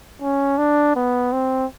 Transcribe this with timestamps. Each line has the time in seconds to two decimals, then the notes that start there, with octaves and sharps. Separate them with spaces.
0.22 C#4
0.58 D4
0.96 B3
1.32 C4